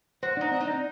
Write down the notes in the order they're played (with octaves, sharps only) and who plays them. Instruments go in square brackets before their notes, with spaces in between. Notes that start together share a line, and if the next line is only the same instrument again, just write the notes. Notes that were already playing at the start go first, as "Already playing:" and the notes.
[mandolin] F#4 [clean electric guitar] C5
[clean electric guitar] D4
[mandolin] D#4
[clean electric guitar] C4
[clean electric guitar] D4 [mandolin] D#4